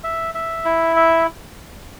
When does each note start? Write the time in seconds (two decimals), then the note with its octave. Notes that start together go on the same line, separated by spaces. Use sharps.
0.04 E5
0.34 E5
0.65 E4
0.96 E5